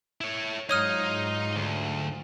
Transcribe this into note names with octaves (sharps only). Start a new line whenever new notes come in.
E4 C#5
G#2 F#3 D#4 F4 C#5 D#6 F6
D2